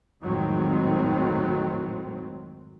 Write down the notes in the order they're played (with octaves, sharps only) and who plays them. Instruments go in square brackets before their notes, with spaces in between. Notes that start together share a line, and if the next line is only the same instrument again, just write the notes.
[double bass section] G#1 F2 A2 D#3 F#3 C4